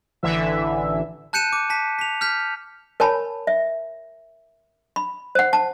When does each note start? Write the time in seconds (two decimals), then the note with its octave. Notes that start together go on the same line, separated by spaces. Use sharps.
0.23 A1 D3 E3 E5
1.33 A5 F#6 G6 C#7 D#7 E7
1.53 D6
1.70 A5 B6
1.99 B6 F7
2.21 F6 G6 B6
3.00 A#4 C#5 G#5 A5 B5
3.47 E5
4.96 B5
5.35 C5 F#5
5.53 A5